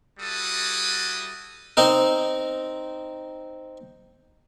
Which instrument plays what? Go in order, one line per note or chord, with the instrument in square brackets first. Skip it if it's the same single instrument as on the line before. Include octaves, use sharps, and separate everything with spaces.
[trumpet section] G3 E4 F#4 A4 D#6
[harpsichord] C4 D#4 A#4